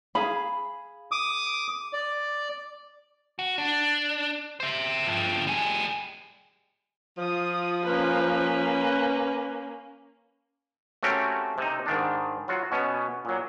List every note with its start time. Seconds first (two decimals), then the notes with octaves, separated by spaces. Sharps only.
0.15 G#4 F5 B5
1.11 D6 D#6
1.93 D5
3.39 F#4
3.58 D4
4.60 C5 E5
5.06 G2 F3
5.47 G3 G#4
7.18 F3 F4 D#6
7.85 A#3 C#4 B4
11.03 A3 C4 C#4 F#4 G4 A#4
11.58 C3 D#4
11.86 G#2 D#3 D4
12.48 F#3 F4 F#4
12.72 B2 B3 C#4
13.25 A#2 F#3